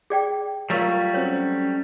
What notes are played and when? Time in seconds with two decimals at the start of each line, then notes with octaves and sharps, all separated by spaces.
0.10 G#4 D5 G5
0.70 F#3 G3 A3 F4 A4 A#4 C#5
1.14 C4 C#4 F#4 C#5